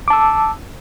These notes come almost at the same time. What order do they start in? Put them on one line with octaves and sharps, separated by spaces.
D6 A5 E6